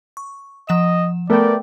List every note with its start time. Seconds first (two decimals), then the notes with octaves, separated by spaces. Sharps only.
0.17 C#6
0.69 F3 D#5 F#5 E7
1.30 A3 B3 A#4 D5 G5